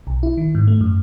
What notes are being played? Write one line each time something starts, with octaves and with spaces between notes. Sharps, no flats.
B1
E4
D#3
G#2
A3
F#2